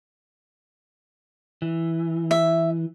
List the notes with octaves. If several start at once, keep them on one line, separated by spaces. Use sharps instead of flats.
E3
E5